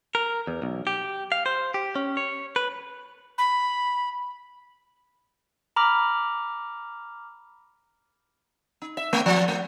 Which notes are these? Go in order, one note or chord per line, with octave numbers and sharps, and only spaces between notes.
A#4
E2
B1
G4
F5
C5
G4
C#4
C#5
B4
B5
A#5 B5 D6 F6
D#4
E5
A3
F3
A3